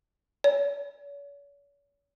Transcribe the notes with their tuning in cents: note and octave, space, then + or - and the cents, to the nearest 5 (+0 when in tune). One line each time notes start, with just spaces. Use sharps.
C#5 +45